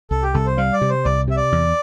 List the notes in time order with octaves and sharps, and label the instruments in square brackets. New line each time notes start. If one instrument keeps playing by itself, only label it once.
[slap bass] C2 [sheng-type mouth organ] A4
[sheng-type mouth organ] G4
[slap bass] C2 [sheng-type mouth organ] A4
[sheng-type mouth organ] C5
[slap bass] G3 [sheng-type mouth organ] F5
[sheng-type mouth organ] D5
[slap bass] C3
[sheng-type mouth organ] C5
[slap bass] C2 [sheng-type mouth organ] D5
[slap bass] C3 [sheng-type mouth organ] E5
[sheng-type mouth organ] D5
[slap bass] E2